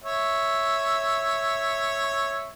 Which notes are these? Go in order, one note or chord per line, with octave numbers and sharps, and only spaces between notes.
C#5 E5